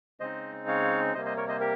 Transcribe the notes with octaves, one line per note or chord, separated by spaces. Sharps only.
C#3 G#3 C4 D#4 C5 D#5
C#5 F5
C3 G3 A#3 C5 D#5
C5 D#5
A#4 C#5
C5 D#5
G4 A#4